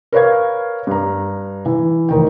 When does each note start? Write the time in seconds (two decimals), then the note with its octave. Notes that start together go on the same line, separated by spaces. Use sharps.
0.12 A#4 B4 C#5 F5 G#6
0.87 G2 A#5
1.66 E3
2.09 F1 D#3 G5